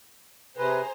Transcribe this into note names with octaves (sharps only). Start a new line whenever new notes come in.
C3 G#4 B4 C5 A#5